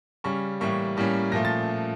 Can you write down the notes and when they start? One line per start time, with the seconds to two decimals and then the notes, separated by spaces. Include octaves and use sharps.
0.24 C#3 G3 C#4 C#6
0.60 A2 E3 G3 A#3 C#6
0.97 A2 G3 A#3 C#4
1.32 A#2 F3 A3 A#6
1.45 A6